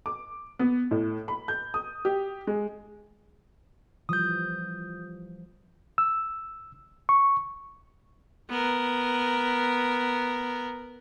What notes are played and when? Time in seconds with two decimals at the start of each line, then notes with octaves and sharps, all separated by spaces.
0.06 D6
0.59 B3
0.91 A2
1.28 B5
1.48 G6
1.74 D#6
2.05 G4
2.47 G#3
4.09 E3 F3 G3 D#6 G6
5.98 E6
7.09 C#6
8.49 B3 A#4